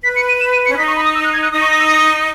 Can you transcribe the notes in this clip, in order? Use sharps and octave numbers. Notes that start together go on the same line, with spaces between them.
B4 B6
C#7
D#7
E7
D#7
C#4 C#7
D#4 B6
C#6
B5
D#6
E6
F#6
G#6
F#6
D#4 D#6
C#6
D#6
E6
D#6